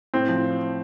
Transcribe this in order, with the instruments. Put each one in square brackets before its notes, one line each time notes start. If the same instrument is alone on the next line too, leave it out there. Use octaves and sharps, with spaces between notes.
[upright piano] A2 C4
F3